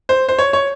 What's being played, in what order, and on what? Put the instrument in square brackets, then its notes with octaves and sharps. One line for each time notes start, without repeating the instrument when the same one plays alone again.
[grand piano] C5
C5
C#5
C#5